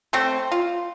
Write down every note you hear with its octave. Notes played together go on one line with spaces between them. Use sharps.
A3 C4 C5
F4